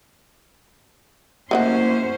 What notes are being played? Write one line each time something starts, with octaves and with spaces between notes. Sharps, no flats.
A3 A#3 C#4 E4 F#4 C5 D#5 F#5